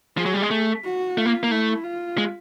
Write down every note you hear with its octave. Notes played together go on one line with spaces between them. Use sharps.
F3 G#4
F#3
G3
G#3
A3
F#4
A3 F4
A#3
A#3
A3 E4
F4
G#3